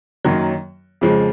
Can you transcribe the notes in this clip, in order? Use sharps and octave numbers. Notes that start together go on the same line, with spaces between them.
F#2 D#3 F#3 A#3
F2 C#3 F3 G#3